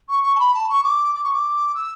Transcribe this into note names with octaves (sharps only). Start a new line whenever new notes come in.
C#6
C#6
A5
B5
A5
C#6
D6
D6
C#6
D6
E6